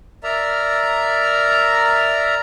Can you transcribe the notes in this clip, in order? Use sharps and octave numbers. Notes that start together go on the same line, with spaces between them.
A#4 D5 E5 A#5